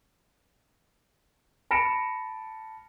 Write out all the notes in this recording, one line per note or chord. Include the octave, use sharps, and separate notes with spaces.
A5 B5 A#6 C#7 D7 E7